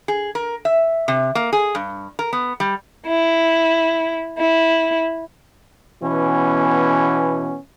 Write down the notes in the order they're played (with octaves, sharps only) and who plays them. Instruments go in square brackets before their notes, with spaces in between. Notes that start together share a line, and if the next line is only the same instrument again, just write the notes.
[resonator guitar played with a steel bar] G#4
A#4
E5
C3
A#3
G#4
G2
A#4
B3
G3
[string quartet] E4
E4
[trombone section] B2 E3 B3 C#4